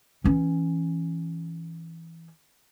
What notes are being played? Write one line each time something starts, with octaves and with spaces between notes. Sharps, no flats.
E3 C#4